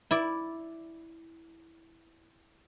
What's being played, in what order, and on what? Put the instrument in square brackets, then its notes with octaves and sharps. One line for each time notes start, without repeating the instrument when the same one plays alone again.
[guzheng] E4 D5